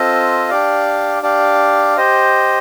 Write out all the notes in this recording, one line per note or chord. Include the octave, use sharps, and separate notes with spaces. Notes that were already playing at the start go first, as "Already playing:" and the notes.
Already playing: C4 F4 A4 D#5
D4 G4 D5 F5
D4 G4 D5 F5
G4 C5 D#5